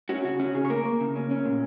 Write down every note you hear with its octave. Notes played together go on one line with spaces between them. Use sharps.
C#4 F#4
C#3 F#4
C#4 F#4
C#3 G#4
C#5
A#3 A#4
A#3
C#3
C#4
C#4
A#2